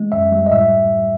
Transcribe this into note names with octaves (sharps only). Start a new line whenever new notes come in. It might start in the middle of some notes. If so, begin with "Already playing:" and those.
Already playing: G#3
F#2 E5
G3
D#5
A2 E5